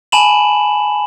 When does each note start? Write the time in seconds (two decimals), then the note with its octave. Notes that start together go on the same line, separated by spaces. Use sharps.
0.12 G#5 A5 B5 E7 F#7